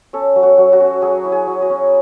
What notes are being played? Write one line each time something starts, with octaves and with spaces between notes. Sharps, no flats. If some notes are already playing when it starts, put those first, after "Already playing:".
C#4 A4
F#3
F#4
F#3
F#4
C#4
F#3 G#4
E4
G#4
F#3
F#4
C#4